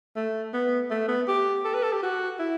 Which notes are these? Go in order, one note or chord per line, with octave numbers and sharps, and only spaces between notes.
A3
B3
A3
B3
G4
A4
B4
A4
G4
F#4
E4